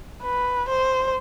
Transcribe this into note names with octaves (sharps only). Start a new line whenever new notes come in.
B4
C5